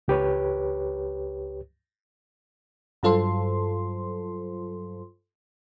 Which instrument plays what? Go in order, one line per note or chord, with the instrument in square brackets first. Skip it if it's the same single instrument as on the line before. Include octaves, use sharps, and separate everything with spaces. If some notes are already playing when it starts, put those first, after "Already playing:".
[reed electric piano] C#2 G4 B4 C#5
[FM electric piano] G2 F#3 F4 A4 C5 C6